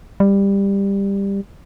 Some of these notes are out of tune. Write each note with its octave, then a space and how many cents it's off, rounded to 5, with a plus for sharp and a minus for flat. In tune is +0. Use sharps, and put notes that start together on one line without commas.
G3 +15